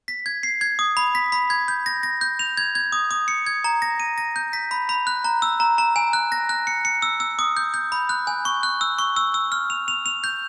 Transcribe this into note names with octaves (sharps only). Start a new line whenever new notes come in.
B6
G#6
C7
G#6
D#6
B5
B6
B5
G#6
G6
A#6
A#6
G6
F7
G#6
G#6
D#6
D#6
C#7
G#6
A#5
A#6
D#7
A#6
G6
B6
B5
B5
F#6
A#5
E6
A#5
A#5
G#5
F#6
A#6
F#6
C#7
C#7
E6
E6
D#6
G6
G6
B5
F#6
G#5
C#6
F#6
E6
C#6
E6
E6
F6
F7
F7
F7
G6